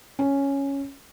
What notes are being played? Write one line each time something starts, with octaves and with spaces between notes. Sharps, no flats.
C#4